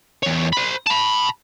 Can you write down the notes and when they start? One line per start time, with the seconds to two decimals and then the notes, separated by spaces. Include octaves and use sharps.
0.23 E2 C#5
0.53 C5 B5
0.87 A5 B5